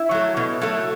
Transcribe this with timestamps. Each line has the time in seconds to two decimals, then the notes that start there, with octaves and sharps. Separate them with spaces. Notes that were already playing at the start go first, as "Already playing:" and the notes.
Already playing: E4
0.11 F#3 A3
0.37 B2
0.62 F#3 A3